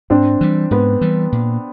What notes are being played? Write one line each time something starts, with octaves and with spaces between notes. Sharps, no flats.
G#2 C4 D4
E3 G3
G#2 B3
E3 G3
A#2